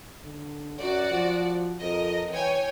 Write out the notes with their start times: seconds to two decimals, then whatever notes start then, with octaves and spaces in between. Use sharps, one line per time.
0.24 D3
0.79 F#2 F#4 D5 F#5
1.10 F3
1.81 F2 A#4 D#5
2.30 E3 C#5 G5 G#5